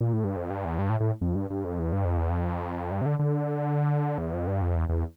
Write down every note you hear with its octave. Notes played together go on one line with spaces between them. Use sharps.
A#2
A2
G2
F2
G2
E2
G2
A2
A2
F2
G2
G2
F2
E2
G2
F2
E2
F2
G2
C3
D3
D3
E2
F2
G2
F2
E2
E2